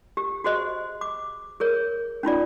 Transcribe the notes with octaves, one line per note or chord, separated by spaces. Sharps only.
G4
F#4 G#4 C5 D#5
D6
G#4 A#4 C#5
C#4 D#4 F4 D5